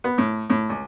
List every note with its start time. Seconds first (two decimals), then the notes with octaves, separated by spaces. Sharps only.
0.04 B3
0.18 A2
0.50 A2
0.69 C#2